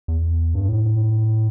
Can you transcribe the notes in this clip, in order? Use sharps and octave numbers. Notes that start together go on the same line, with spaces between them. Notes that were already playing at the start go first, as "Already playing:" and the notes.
E2
G2
A2